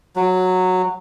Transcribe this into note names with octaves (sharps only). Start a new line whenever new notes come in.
F#3